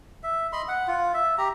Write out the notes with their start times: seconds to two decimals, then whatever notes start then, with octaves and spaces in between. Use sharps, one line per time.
0.23 E5
0.53 D#5 B5 C6
0.68 F#5
0.88 F4
1.14 E5
1.38 G4 A#5